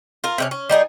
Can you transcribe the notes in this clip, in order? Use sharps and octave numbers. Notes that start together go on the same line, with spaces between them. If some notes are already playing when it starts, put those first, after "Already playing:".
F4 A#4
C3 A3 C#4
C#4
G3 D#4 F4 G#4